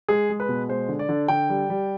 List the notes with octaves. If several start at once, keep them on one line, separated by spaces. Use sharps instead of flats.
G#3 G#4
G#3
B4
B2
G#3 C5
D3
D5
D3
D3 G5
G3
G3